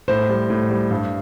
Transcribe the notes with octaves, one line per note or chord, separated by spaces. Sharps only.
A2 C5
G3
A2
G3
G2